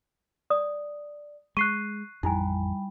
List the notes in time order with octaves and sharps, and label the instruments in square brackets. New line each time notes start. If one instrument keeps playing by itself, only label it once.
[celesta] D5 [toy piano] D#6
[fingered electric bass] G#3 [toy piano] C#6 [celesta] F#6 C7 D#7
[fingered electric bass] A1 F2 [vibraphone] G3 G5 B5 [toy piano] D#4 E4 G#5